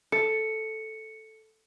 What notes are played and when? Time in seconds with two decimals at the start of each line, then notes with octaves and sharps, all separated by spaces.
0.12 A4 C#7